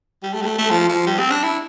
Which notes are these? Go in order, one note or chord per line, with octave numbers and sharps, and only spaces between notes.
G3
A3
G3
A3
A3
F3
F3
G3
C4
D4
E4